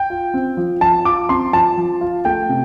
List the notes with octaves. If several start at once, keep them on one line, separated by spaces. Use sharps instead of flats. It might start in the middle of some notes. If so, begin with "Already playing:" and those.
Already playing: G5
F4
C4
F3
F3 A5
F4 D6
C4 C6
F3 A5
F3
F4
A3 G5
C3